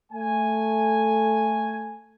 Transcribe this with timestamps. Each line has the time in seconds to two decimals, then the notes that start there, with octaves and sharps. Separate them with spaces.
0.12 A3 G#5